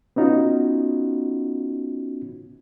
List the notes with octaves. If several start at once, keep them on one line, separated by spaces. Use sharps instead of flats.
B3 C#4 D#4 F4 F#4